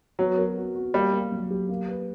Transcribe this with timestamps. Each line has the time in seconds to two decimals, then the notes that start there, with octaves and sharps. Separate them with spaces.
0.19 F#3 B3
0.38 A#4
0.57 F#4
0.75 F#4
0.94 G3 A#3
1.13 A#3
1.32 F#3
1.51 G4
1.69 A#3
1.88 B4